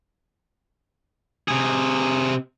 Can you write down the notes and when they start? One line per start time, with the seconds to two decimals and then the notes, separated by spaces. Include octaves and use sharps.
1.48 C3 G#4